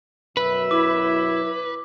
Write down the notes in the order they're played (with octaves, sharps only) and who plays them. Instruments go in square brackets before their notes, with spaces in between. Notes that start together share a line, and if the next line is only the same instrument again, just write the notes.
[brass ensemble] F#2 B2 E5 [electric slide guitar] B4
[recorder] E4 [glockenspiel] D6